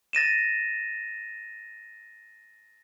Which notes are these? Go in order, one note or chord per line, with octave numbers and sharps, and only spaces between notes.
A6 A#6 D#7 E7